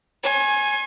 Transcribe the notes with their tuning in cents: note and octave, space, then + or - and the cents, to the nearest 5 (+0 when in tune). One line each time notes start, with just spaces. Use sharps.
G#5 +5 C#6 -45